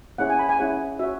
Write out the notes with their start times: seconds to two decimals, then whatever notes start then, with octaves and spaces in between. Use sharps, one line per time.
0.18 C#4 E4 G#4 C#5 F#5
0.30 G#5
0.39 B5
0.49 G#5
0.59 C#4 E4 G#4 C#5 F#5
0.99 F#4 C#5 E5